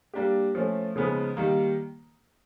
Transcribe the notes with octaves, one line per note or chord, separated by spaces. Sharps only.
G3 A#3 D4 G4
F3 A3 C#4
C#3 F3 G#3 B3 D#4
D#3 G3 A#3